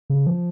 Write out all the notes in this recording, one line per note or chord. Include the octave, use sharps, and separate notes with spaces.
C#3
F3